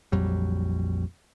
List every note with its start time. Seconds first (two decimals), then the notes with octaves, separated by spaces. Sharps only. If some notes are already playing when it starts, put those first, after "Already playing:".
0.12 A#1 F2 F#3 G3